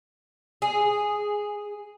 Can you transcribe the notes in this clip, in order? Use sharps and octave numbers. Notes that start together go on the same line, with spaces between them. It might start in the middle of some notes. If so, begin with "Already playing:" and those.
G#4